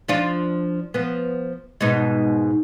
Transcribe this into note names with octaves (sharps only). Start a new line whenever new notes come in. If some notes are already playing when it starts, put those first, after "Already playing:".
F3 D4 F4
F3 B3
G#2 B2 D#4